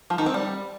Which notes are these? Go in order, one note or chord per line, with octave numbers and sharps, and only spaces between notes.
F3
D#3
C4
G3